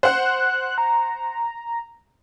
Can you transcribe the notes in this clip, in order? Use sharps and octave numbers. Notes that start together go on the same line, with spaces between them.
C5 F#5 F#6
A#5